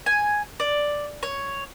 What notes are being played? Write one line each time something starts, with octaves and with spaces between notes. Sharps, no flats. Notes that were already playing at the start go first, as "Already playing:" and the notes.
G#5
D5
C#5